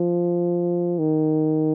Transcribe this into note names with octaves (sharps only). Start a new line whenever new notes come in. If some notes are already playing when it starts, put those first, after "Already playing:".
Already playing: F3
D#3